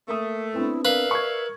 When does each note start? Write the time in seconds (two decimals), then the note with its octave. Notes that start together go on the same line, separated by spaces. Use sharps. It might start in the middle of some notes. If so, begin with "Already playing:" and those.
0.08 A3 A#3 D#6
0.54 B3 C4 D4 E4
0.85 A#4 B4 D5 E5 F5
1.11 C#6 G#6